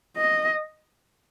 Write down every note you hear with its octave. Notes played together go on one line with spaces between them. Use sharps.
D#5